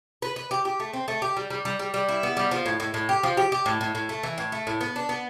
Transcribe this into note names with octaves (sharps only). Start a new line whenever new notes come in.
B4
B4
G4
G4
A3
C4
A3
G4
G3
G3
G3
G3
G3
E4
B3
G3
F3
A2
A2
A2
G4
F3
G4
G4
A2
A2
A2
A3
E3
A2
A3
A2
B3
D4
B3